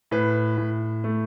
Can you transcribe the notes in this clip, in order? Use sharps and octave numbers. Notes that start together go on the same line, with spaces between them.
A2 B4
A2
A3